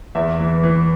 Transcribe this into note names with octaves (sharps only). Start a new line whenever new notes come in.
E2 E5
E3
E3